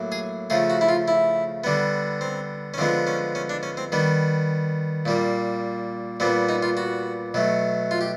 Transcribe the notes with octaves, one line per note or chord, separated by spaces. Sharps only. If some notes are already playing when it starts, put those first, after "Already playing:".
Already playing: A2 F#3 A#3
G#4
C#3 F3 A3 G#4
F#4
E4
F4
E4
D3 G3 B3
C4
C#4
D3 F3 G#3 B3 C4
C#4
C#4
D4
C#4
C4
D#3 G3 B3
A#2 G3 A#3
A#2 G3 B3 C4
D#4
F4
F#4
B2 F#3 A3
F4
G4